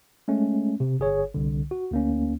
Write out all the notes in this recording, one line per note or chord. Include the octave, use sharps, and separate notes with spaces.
G#3 A3 C#4
C3
G1 G#4 C#5
C2 D3
F#4
D2 A#3 C#4